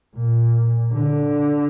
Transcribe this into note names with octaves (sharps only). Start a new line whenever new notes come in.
A#2
D3